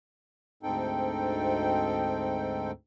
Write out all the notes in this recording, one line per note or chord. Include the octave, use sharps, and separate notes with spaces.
D2 G#2 C4 D#4 A4 G5